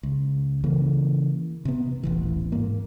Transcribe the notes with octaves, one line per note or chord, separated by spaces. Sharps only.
C#2
C#3 E3 A#3
C3 B3
D#1 A1 E3
G#2 A#3